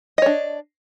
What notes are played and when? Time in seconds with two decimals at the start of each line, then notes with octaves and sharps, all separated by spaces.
0.18 D#5
0.22 C#5
0.26 D4